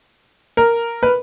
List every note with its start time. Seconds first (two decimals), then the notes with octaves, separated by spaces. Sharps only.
0.57 A#4
1.03 B4